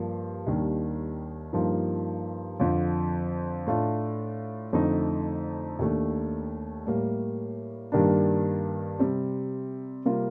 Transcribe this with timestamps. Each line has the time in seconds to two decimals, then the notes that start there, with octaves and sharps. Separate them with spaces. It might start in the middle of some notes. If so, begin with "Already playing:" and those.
Already playing: G2 F3 A#3
0.47 D#2 D#3 G3 D4
1.53 G2 F3 A#3 D#4
2.60 F2 D3 F3
3.67 A2 A3 D4 F4
4.73 F2 D3 A3 C4 D#4
5.79 D#2 D#3 A3 D4
6.87 A2 G3 A#3
7.92 G2 D#3 G3 A#3 D4
8.99 C3 G3 C4
10.05 C3 G3 A#3 F4